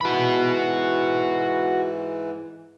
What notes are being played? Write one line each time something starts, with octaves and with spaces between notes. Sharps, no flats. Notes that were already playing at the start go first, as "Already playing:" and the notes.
G#2 E3 F#4 B5